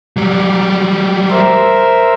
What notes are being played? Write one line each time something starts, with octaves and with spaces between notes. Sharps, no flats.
F#3 G3
A#4 C5 E5